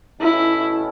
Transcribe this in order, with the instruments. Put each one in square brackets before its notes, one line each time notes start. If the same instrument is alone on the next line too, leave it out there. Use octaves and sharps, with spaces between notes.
[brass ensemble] B2 A3 C#4 [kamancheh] E4